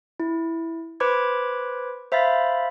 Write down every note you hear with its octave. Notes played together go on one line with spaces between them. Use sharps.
E4
B4 C5 B5 D6 G#6
C5 E5 F5 B5 A6